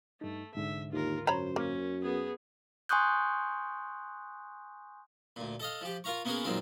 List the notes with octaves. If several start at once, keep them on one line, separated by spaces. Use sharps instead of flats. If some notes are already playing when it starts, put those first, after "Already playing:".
G2 A3 D#4
C2 G#2 D3 E5
D#2 F4 A#4
F#2 C5 C#5 A#5 B5
A#3 C#4
B3 G#4
G#5 C6 C#6 D#6 F#6 G6
D2 A#2
A4 D#5 F5
F3 G4
F4 A#4 F5 A#5 C#6
A#3 B3 C#4 F#4 G#4 A#4
F#2 A#2 D#3 G#3 C4 F4